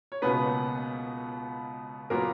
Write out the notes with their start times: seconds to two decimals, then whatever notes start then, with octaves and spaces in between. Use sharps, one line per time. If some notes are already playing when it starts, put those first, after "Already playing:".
0.12 C#5
0.22 C#2 B2 A#3 B3 C#4 B4
2.10 A#2 F#3 A#3 B3 A#4